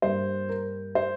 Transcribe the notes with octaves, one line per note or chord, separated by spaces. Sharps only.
G2 G3 A#3 C5
A#4
C5